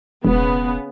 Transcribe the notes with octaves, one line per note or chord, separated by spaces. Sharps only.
E1 C#3 B3